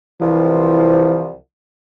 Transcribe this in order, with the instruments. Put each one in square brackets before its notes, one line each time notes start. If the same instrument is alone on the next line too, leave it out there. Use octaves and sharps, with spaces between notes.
[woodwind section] C2 F3 [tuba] E3